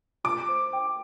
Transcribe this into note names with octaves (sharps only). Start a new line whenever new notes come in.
F4 D6
C5
G5